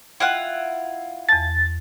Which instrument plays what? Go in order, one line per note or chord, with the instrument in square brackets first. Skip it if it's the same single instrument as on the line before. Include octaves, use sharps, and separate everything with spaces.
[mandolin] E4 F4 F#5 [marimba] G5 F6 G#6
[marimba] E2 A5 [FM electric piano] A6